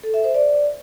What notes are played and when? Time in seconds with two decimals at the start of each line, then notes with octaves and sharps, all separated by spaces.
0.04 A4
0.14 E5
0.24 C5
0.34 D5